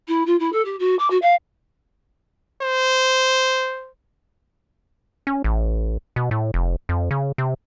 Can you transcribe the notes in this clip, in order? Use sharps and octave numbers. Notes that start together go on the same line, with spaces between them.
E4
F4
E4
A4
G4
F#4
D6
F#4
F5
C5
C#4
A1
B2
A2
F1
F2
C#3
C3